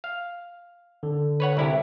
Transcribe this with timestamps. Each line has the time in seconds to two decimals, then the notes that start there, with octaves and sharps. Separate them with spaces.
0.04 F5
1.03 D3
1.40 B4 C#5 F#5
1.57 C2 E4 G4